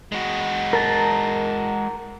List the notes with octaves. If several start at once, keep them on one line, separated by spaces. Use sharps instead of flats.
G#3 F#4
A#4 A5 A#5